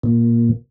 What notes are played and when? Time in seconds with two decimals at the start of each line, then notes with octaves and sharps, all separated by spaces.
0.03 A#2